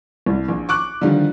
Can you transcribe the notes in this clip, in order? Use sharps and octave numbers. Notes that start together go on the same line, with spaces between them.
C2
A#1
C#6 D6 F#6
D3 D#3 F3 G3